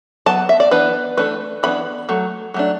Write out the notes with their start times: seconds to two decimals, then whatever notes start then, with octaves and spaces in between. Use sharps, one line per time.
0.26 F#3 B3 A5
0.49 E5
0.60 D5
0.71 E3 B3 D4 B4
1.17 E3 A3 D4 B4
1.63 E3 B3 D4 B5
2.09 F#3 A3
2.54 F#3 A3 D4